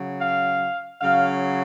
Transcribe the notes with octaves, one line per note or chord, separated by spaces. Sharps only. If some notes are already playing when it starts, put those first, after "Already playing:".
Already playing: C#3 F#3
F5
C#3 F#3 F5